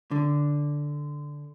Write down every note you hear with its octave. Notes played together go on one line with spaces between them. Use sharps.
D3